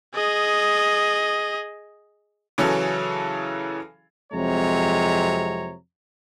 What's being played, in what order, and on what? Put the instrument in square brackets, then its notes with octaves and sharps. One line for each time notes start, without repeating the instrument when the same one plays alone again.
[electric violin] G#4 D#5
[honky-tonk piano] C#3 E3 F#3 C#4 G#4 A4
[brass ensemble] F2 C3 F#3 G#3 C#5 A#5